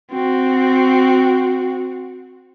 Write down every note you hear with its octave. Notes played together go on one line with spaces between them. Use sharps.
C4 F#4